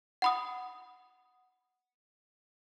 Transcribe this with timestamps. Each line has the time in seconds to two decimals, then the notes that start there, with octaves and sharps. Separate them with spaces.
0.22 F#5 B5 D#6